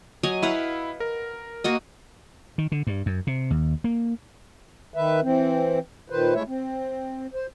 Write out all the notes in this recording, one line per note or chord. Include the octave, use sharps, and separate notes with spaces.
F#3 D#5 G#5
E4 B4 F5 F#5
A#4
A#3 F#4 D#5
D#3
D3
G2
F#2
C3
D#2
A#3
D#3 B4 E5
E3 C4
A#2 D#3 B4 C5
G#3 A3 E4 C#5 E5
C4
C5